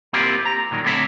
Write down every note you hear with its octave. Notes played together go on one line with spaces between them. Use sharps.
A#3 C4 E4 F4 G4 A#4
A#5
A#2 D#3 F#3
D3 A3 C4 C#5 E5 A#5